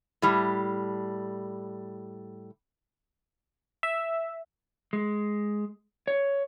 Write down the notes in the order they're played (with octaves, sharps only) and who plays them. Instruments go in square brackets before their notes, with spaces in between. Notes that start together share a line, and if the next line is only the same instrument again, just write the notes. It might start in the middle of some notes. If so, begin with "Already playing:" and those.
[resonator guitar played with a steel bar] A2 G3
[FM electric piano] E5
[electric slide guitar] G#3
C#5